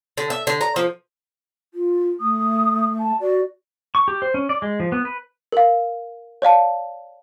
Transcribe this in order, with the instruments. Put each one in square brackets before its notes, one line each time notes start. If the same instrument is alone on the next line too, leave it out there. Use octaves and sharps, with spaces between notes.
[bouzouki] D3
E5
D3
A#5
F3
[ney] F4
[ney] A3 [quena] D#6
[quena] A5
[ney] F#4 [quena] D5
[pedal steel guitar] C#6
G4
C5
C#4
D5
G#3
F3
B3
B4
[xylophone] A#4 F5
C#5 D5 F5 A5